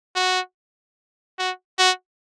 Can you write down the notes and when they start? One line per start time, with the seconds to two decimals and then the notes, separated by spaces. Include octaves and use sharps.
0.16 F#4
1.39 F#4
1.78 F#4